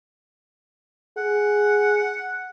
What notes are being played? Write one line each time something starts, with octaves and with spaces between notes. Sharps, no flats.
G#4 F#5